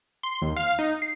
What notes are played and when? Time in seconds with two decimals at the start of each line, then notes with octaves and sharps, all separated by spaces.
0.23 C6
0.42 D#2
0.56 F5
0.79 D#4
1.02 C7